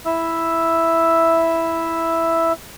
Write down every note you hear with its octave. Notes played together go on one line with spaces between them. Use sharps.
E4 E5 E6